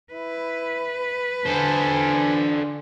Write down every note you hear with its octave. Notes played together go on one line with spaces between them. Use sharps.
E4 B4
D3 A4 C5 G#5